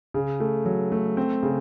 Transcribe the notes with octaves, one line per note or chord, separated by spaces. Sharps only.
C#3
A3
F#3
A3
C4
C#3